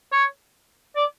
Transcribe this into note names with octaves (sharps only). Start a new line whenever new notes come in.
C#5
D5